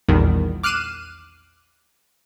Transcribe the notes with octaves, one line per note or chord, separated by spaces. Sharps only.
A#1 E2 A#2 D#3 G3
D6 F6 F#6 C7 D#7 E7